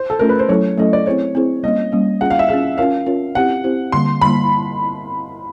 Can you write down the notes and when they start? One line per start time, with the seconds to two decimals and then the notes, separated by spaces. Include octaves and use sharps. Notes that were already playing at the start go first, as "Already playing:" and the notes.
Already playing: C5
0.10 A4
0.19 A3 C#4 F4 A#4
0.29 B4
0.39 C5
0.49 F#3 A3 C#4 E4 A4 C#5
0.78 F#3 A3 C#4 E4 A4 D#5
0.93 D5
1.06 C4 E4 G#4 C5 C#5
1.35 C4 E4 G#4 C5
1.63 G3 A#3 C#4 D#5
1.92 G3 A#3 C#4
2.21 C#4 F4 G#4 F#5
2.30 F5
2.39 E5
2.49 C#4 F4 G#4 F5
2.78 C#4 F4 A#4 C#5 F5
3.06 C#4 F4 A#4 C#5
3.35 C4 E4 G4 C5 F#5
3.64 C4 E4 G4 C5
3.92 D3 G3 A#3 C6
4.21 D3 G3 A#3 B5